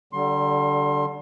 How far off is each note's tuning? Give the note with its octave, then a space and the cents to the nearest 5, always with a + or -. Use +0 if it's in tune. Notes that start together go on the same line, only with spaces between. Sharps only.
D3 +0 G3 -30 C6 +25